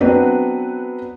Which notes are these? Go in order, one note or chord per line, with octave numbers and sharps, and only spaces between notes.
F#3 B3 C4 D4 B4